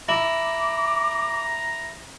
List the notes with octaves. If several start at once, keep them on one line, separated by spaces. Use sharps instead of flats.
E4 A#5 D6